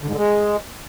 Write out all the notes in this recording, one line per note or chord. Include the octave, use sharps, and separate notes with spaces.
D3
G#2
D3
G#3